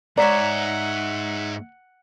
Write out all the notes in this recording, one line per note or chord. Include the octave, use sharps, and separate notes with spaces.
G#2 C#5 D5 E5 F#5 A#5